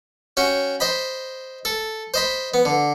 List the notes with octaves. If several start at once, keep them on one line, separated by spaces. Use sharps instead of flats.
C#4 F#4 G5
C5 D#5 B5
A4
C5 D#5 B5
B3
D3